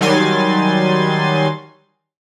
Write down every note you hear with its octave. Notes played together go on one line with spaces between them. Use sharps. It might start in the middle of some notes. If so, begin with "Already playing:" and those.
D#3 F#3 G3 G#5 C6 A6